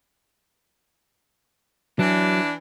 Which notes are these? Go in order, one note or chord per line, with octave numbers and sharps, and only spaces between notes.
E3 F#3 D4